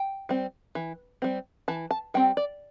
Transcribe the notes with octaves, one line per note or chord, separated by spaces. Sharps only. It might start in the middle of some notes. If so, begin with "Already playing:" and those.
Already playing: G5
G3 C4
E3
G3 C4
E3 A5
A5
G3 C4 G5
D5